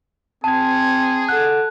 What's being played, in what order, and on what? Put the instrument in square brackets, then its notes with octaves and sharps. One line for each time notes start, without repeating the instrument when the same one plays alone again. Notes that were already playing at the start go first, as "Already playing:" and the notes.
[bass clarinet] C4 [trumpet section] G#4 [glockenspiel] A5 G#6
[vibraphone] A4 F#5 [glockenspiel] F#6